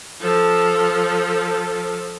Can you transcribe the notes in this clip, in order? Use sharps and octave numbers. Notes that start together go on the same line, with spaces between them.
F3 A4